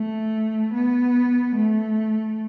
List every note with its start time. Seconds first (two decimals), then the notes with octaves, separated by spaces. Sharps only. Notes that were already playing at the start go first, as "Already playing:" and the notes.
Already playing: A3
0.72 B3
1.54 A3